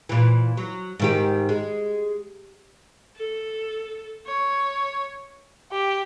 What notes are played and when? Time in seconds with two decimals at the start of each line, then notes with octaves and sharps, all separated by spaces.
0.09 A#2 E3
0.57 F#3
1.00 G#2 D#3 G4
1.49 G#3
3.16 A4
4.26 C#5
5.72 G4